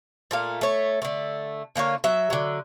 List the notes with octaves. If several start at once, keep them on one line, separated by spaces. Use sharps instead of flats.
A#2 A3 F5
A3 C#5
D3 A3
D3 A#3 F4 C#5
F#3 E5
D3 F#3